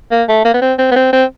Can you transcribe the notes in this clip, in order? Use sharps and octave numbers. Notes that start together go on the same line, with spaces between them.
A#3
A3
A#3
B3
C4
C4
B3
C4
C4